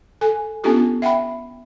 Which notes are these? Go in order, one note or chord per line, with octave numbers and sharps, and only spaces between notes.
A4 G#5
B3 C#4 D4 F4 G4 A4
E5 F#5 G5 B5